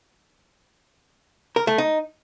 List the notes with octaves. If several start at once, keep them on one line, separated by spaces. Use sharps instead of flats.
A#4
A3
D#4